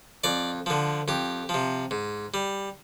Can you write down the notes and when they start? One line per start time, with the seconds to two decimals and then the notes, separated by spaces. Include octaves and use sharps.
0.24 F2 D5
0.66 D3 F3
1.08 F2 G4
1.49 F3
1.54 C3
1.91 G#2
2.34 G3